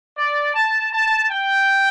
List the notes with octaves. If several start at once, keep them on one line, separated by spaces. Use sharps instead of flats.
D5
A5
A5
G5